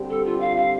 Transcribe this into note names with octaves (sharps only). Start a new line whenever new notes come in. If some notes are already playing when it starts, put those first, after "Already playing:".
Already playing: D3 G3 C4 G4
A4
F4
F5
F5